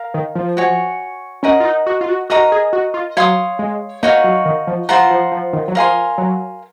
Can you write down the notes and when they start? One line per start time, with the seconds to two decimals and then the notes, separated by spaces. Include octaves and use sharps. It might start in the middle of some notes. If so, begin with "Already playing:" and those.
Already playing: A#4 F5
0.14 D#3
0.35 F3
0.57 F#4 C#5 G#5
1.43 C#4 A#4 D#5 F#5
1.60 F4
1.65 D#4
1.86 F#4
2.01 F4
2.09 F#4
2.30 F#4 A#4 D#5 A#5
2.52 G#4
2.73 F#4
2.94 F4
3.17 F#3 C#5 F5 C6 D#6
3.59 G#3
4.03 A#3 D#4 F#4 C#5 F5
4.24 F#3
4.45 D#3
4.67 F3
4.89 F3 F4 C5 F#5 A#5
5.10 F3
5.32 F3
5.53 D#3
5.68 F#3
5.75 F3 A#4 F5 G#5 C6
6.18 F#3